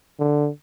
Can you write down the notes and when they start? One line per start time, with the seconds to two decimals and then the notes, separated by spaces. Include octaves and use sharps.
0.19 D3